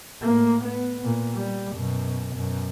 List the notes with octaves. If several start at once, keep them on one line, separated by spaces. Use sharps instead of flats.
A2 A#3
B3
A#2
G3
F#2 B2
F#2 B2